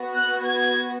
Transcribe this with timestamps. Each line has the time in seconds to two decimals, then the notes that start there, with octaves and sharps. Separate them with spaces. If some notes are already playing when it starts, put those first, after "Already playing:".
Already playing: B3 F#4
0.14 F#6
0.43 G#6